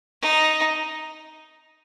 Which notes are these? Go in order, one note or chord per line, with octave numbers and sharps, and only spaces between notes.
D#4